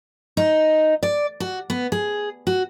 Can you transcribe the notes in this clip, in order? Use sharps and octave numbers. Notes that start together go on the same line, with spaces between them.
D#4
D5
F#4
B3
G#4
F#4